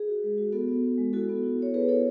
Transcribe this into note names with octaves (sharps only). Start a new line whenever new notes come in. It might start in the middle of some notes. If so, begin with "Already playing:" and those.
Already playing: G#4
F#4
G#3
F#4
B3 F#4 A4
B3
B3
G#3
E4 F#4 A4
B3
E4
B3 C#5
B3 G#4 B4
E4 A4 C#5